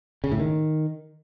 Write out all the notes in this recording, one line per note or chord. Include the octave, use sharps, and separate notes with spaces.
C#3
A2
D#3